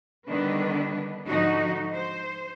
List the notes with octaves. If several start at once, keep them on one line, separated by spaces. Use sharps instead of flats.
D3 D#3 G3 B3 D4 B4
G#2 D3 F3 D#4 F#4
C5